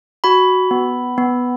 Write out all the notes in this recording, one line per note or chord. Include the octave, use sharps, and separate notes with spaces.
F#4 B5
B3
B3